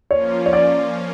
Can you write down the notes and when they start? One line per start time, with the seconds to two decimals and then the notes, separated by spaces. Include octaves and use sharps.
0.11 F3 A#3 C#4 F4 C#5
0.46 C#5
0.53 D5